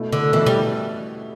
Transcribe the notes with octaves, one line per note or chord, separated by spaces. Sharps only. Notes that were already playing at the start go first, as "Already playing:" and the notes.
Already playing: B2 A3 E4
D3
B2 E3 A3 E4
G3